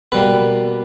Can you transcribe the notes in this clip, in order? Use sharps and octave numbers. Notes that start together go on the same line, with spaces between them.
B2 G3 A#3 B4